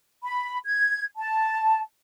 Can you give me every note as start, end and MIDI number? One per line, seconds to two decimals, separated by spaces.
0.23 0.58 83
0.64 1.03 92
1.18 1.81 81